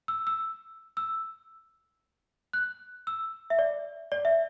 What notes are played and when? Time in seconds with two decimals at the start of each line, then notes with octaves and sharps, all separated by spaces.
0.08 E6
0.27 E6
0.97 E6
2.53 F#6
3.07 E6
3.50 E5
3.59 D5
4.12 D5
4.25 E5